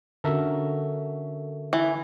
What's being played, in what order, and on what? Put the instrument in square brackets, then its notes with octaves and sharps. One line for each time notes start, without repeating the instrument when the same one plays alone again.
[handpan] D3 C#4 F#4 [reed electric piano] A4 A#4 E5
[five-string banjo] E3